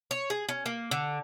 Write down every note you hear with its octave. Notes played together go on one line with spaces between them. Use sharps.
C#5
G#4
C#4
A#3
D3